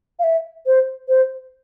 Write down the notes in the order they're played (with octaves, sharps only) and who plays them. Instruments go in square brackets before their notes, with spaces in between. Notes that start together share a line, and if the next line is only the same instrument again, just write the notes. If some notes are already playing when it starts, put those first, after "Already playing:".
[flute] F5
E5
C5
C5